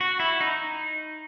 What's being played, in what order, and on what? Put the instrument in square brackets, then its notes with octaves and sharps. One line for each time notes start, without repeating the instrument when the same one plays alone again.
[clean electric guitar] F#4
E4
D#4